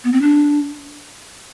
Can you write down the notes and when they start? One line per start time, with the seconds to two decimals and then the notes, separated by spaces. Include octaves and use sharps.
0.04 B3
0.12 C4
0.22 D4